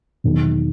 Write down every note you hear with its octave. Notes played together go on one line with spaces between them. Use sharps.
E1 E2 D#3 F#3